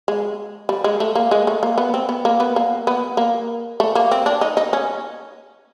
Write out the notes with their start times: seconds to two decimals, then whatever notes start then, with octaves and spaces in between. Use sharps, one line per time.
0.08 G#3
0.69 G3
0.84 G#3
1.00 A3
1.15 A#3
1.31 G#3
1.47 A3
1.63 A#3
1.78 B3
1.94 C4
2.09 B3
2.25 A#3
2.40 B3
2.56 A#3
2.87 B3
3.17 A#3
3.80 A3
3.95 A#3
4.11 C4
4.26 D4
4.41 D#4
4.57 D#4
4.73 C#4